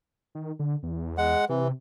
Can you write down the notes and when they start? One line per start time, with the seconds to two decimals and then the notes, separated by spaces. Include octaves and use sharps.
0.35 D#3
0.59 D3
0.83 E2
1.18 G#3 F#5
1.49 C3 E3